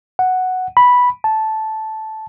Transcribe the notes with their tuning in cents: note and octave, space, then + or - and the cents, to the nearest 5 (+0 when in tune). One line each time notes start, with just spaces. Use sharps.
F#5 +0
B5 -5
A5 -10